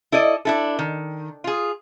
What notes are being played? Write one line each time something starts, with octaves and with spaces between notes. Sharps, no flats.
E4 A4 D5 D#5
D4 E4 A4
D#3
F4 G#4